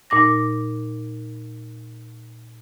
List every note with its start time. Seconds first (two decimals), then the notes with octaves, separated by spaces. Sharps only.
0.10 A#2 D#4 D6 A#6